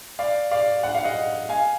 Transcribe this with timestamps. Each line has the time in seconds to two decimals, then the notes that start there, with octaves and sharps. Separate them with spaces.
0.19 D5 F5
0.51 D5 F5
0.83 F#5
0.95 F5
1.04 D#5 F#5
1.49 F5 G#5